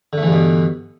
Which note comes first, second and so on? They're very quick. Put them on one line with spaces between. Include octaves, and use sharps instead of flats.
D3 A3 E3 G2 B2